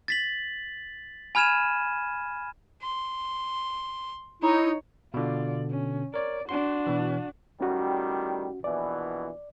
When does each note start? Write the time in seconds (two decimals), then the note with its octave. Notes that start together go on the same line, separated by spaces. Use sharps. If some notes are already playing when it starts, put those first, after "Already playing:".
0.08 A6 B6 F#7
1.35 G#5 B5 F6 G#6 D#7 E7
2.82 C6
4.42 D#4 E4 C#5
5.14 B2 D3 F4 D5
5.70 C#4
6.14 A#4 C#5 D5
6.49 D4 F#4 C6
6.87 B2 E3
7.61 A2 D#3 G3 C#4 F#4
8.64 A#1 B2 E3 D5